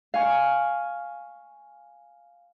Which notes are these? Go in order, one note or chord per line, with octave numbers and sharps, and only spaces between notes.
F5 G#5 C#6